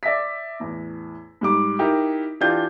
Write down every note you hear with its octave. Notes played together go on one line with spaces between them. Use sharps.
D5 E5 A#6 B6
E2 A2
G#2 G3 D6
D#4 E4 G4 A#4
E3 D4 F4 G4 G6